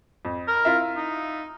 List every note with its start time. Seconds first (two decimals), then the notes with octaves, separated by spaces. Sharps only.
0.25 F2
0.48 A#4
0.65 E4 F4 E5
0.96 D#4